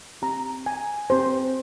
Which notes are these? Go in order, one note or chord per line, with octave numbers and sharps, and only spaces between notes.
C4 G4 A#5
G#5
C4 G4 C5